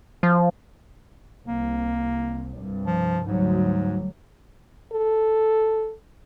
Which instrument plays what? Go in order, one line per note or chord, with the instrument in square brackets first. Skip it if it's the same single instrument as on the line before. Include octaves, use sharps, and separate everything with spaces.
[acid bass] F3
[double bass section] C2 [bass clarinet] A#3
[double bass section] C2 G2
[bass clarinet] F3
[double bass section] D2 F#3 G3 [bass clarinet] G#2
[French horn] A4